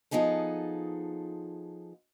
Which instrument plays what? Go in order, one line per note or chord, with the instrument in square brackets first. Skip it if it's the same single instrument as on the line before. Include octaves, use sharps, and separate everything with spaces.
[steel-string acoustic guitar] F3 B3 D#4 G#4 A4